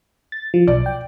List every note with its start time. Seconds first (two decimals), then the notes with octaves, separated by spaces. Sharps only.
0.32 A6
0.54 F3
0.68 B1 D5
0.86 G5